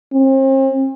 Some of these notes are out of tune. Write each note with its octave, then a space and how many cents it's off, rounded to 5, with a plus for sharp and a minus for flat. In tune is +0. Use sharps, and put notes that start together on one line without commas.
C4 +40